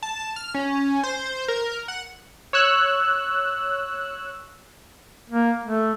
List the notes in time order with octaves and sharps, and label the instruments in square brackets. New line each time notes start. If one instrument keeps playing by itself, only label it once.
[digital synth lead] A5
F6
C#4
C5
A#4
F#5
[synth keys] C#5 E6 F#6
[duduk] A#3
A3